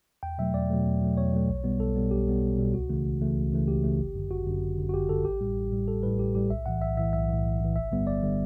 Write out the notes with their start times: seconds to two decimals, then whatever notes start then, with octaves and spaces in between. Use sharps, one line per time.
0.23 E2 G5
0.38 B2 F#3 A3 E5
0.54 E2 D5
0.70 B2 F#3 A3
0.86 E2
1.01 B2 F#3 A3
1.17 E2 C#5
1.33 B2 F#3 A3
1.48 B1
1.64 B2 G3 B3
1.80 B1 A4
1.95 B2 G3 B3
2.11 B1 G4
2.27 B2 G3 B3
2.43 B1
2.58 B2 G3 B3
2.74 C#2 F#4
2.90 C#3 E3 A3
3.05 C#2
3.21 C#3 E3 A3
3.37 C#2
3.52 C#3 E3 A3
3.68 C#2 G4
3.84 C#3 E3 A3
3.99 G1
4.15 F#2 D3
4.31 G1 F#4
4.47 F#2 D3
4.62 G1
4.78 F#2 D3
4.89 F#4
4.94 G1 G4
5.09 F#2 D3 A4
5.24 A1 G4
5.41 A2 G3
5.56 A1
5.72 A2 G3
5.88 A1 A4
6.03 A2 G3 B4
6.19 A1 G4
6.35 A2 G3 G4
6.50 B1 E5
6.66 A2 E3 F#5
6.82 B1 E5
6.97 A2 E3 E5
7.13 B1 E5
7.29 A2 E3
7.45 B1
7.60 A2 E3
7.76 G1 E5
7.92 G2 D3 G3 B3
8.07 G1 D5
8.23 D3 G3 B3